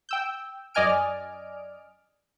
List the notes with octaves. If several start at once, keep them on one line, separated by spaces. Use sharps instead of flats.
G5 E6 G6
F#2 D5 D#5 G#5 F6 D7